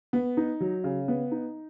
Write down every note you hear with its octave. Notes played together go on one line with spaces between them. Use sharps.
B3
D#4
F#3
C#3
B3
D#4